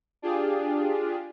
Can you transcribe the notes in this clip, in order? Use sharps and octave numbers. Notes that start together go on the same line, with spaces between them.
D4 F4 G4 G#4